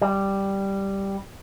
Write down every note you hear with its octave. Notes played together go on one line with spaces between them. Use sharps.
G3